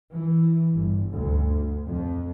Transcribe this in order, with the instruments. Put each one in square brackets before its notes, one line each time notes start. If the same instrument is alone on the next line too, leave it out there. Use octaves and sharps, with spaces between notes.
[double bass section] E3
G1
D2
F2